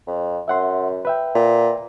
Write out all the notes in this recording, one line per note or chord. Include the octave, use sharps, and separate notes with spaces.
F2
F#2 E5 F#5 C6
B4 E5 G5
A#2